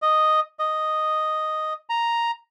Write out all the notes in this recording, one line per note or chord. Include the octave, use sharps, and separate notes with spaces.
D#5
D#5
A#5